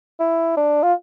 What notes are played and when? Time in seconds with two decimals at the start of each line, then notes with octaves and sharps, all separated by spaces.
0.20 E4
0.57 D4
0.83 F4